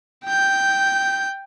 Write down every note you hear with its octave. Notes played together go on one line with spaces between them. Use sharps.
G5 G6